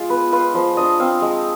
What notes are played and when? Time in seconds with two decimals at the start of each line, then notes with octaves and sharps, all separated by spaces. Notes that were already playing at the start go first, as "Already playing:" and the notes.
Already playing: G#3 F4 F5
0.09 B3 B4
0.32 F4 B4
0.54 F3 C5
0.77 D4 D#5
1.00 C4 F5
1.22 G#3